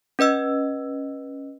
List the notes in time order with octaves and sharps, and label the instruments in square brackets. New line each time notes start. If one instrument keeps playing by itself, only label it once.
[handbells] C#4 B4 D#5 E6